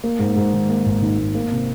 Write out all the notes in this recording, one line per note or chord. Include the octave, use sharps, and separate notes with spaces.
A#3
G#2
G#2
D#3
A#3
G#1
D#3
G#2
A#3
C3